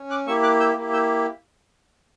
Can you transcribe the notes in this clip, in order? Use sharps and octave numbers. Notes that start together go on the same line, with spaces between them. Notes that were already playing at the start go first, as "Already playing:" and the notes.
Already playing: C#4
D6 F#6
A#3 E4 G4 C#6 E6
D6 F#6
E6 G6
A#3 E4 G4
E6 G6